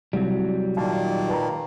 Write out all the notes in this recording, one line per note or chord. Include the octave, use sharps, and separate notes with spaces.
C2 F#3 G3
A#2 D#3 A#3 A5
B4 A5 A#5